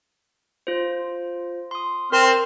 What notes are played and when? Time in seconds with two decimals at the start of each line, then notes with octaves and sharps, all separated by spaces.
0.67 F4 C5
1.71 C6 D#6
2.12 C4 A#4 C5 F6